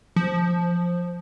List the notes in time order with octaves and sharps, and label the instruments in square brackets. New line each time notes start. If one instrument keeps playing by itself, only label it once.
[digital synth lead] F3